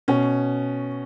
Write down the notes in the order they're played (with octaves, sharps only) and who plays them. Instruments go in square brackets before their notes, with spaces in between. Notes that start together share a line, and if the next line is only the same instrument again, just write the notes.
[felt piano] B2 C#4